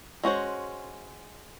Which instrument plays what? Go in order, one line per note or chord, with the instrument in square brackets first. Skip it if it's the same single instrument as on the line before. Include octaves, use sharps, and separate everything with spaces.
[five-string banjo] G#3 C#4 F#4 C5